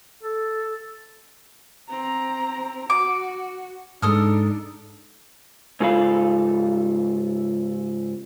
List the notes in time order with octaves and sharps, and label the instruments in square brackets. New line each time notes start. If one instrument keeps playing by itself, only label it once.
[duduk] A4
[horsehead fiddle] C4 A#5
[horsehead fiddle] F#4 [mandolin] D6
[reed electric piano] G#2 G#3 [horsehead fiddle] D4 D#4 [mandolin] A4 D#6 F6
[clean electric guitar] G#2 C#3 F4 A4 F5 B5